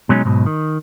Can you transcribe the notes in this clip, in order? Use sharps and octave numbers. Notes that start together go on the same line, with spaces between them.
B2 F#3 G#3 C#4 D#4
B1 G#2 B2
D#3